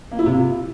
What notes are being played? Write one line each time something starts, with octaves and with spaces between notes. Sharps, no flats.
A#3
E4
C3
F4